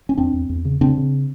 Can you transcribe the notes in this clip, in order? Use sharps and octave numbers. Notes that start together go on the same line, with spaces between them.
C#4
E2 C4 D4
E2
E2
C#3
C#3 C4 D4
C#3